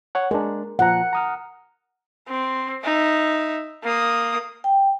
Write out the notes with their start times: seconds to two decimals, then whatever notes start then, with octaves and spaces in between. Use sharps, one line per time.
0.15 C#5 F#5
0.31 G#3 D4 A#4
0.79 A#2 F3 F#5 A#5
1.13 A#5 D#6 F6
2.28 C4
2.84 D#4 E5
3.84 A#3 D#6
4.64 G5